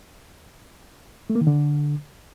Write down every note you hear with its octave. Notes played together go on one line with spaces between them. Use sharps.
A3
A#3
D#3
D3